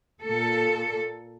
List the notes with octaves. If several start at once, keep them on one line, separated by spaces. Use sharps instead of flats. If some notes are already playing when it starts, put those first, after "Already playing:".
A#2 A4